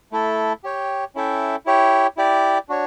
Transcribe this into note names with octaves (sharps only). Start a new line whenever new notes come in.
A3 E4 A4
G4 C#5 G5
C#4 E4 A4 E5 G5
E4 G4 C#5 G5
E4 G4 D5 G5
D4 F#4 C#5